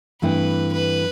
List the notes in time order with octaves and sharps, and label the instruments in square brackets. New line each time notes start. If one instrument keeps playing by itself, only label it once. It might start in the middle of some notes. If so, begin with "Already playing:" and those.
[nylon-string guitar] G2 E3 A3 C4 E4 [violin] B4
[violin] B4